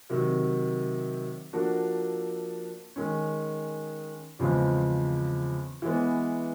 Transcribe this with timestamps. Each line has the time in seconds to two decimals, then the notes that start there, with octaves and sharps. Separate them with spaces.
0.10 C3 D#3 F#3
1.53 F3 A#3 D4 F#4 A4
2.96 D#3 G#3 C#4
4.39 E2 C#3 F3 G#3 C4
5.82 E3 G#3 B3